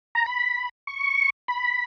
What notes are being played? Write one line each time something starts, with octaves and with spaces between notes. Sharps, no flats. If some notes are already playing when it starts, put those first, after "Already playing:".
A#5
B5
C#6
B5